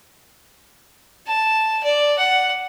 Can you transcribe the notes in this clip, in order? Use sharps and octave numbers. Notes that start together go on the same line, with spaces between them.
A5
D5
F#5